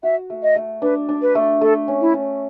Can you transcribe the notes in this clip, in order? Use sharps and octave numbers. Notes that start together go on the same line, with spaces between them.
F#4 E5
A3
D#5
A3
D4 B4
D4
B4
A3
A3 A4
C#4
E4
C#4